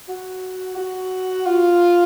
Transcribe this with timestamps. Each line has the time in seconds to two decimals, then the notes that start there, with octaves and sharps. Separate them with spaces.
0.08 F#4
0.77 F#4
1.46 F4